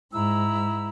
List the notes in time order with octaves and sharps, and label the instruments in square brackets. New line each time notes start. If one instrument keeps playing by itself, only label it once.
[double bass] G#2 [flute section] E4 A#5 E6